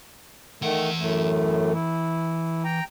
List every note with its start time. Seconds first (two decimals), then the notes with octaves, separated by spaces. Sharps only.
0.62 D#3 E3 A3 F#5
0.99 F#2 A2 A3
1.73 E4
2.64 G5 A#5